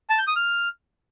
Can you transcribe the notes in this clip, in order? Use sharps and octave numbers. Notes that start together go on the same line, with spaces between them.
A5
G6
D#6
F6